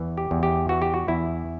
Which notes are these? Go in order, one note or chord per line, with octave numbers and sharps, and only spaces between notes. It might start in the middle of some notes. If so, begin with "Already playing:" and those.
Already playing: E2 E3
G4
E2
G4
E3 F#4
G4
F#4
E2 E4